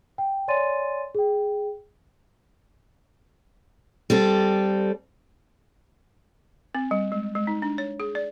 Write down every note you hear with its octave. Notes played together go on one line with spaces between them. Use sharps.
G5
C#5 D5 G#5 C6 A6 D#7
G#4 G5
G3 C4 A4
C4
G3
G#3
G#3
D#4
D4
C#5
G#4
D5